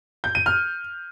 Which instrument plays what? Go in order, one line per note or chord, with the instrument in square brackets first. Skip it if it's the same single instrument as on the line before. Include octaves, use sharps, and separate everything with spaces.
[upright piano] G6
D#7
F6